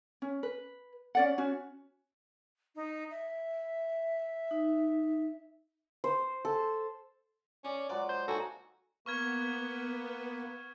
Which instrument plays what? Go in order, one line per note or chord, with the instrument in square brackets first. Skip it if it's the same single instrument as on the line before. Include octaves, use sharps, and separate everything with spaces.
[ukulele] C#4
B4
C#4 D5 F#5
C#4 F#4
[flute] D#4
E5
[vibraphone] D#4
[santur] C5
A4
[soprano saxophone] C#4 [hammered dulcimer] D5
[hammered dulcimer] F3 F#3 G#3 [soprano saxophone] D5
[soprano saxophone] C5 [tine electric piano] G6
[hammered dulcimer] D#3 A#3 D#4 [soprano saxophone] F#4 [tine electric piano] A4 G#5
[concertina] A#3 B4 [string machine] B3 [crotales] C#6 F6 G#6